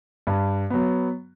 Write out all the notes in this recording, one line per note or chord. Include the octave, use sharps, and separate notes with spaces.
G2
F#3 B3